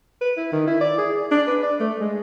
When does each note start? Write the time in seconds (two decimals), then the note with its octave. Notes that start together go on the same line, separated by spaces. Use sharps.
0.21 B4
0.37 E4
0.52 D#3
0.67 E4
0.81 D5
0.98 G#4
1.31 D4
1.47 B4
1.63 D5
1.80 A3
2.00 G#3